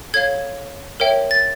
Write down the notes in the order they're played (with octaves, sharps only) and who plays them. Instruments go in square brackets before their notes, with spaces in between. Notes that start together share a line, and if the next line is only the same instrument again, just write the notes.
[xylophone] A4 C#5 F5 G#6
A#4 C#5 E5 G5
A6